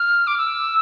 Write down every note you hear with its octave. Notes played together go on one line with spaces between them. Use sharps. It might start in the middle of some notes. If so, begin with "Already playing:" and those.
Already playing: F6
D6
E6